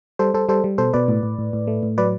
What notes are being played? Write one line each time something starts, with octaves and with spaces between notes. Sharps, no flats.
G3 A4 C5
G3 A4 C5
G3 A4 C5
G3
B2 A4 C5
B2 B4 D5
A2
A2
A2
A2
A3
A2
F#3 B4 D5